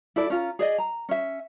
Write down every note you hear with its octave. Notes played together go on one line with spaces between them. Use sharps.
E4 A4 D5
C#4 F4 A#5
G#4 D5 D#5
A#5
C#4 E5